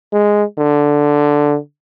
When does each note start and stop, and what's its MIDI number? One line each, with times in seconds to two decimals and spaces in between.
0.13 0.44 56
0.58 1.57 50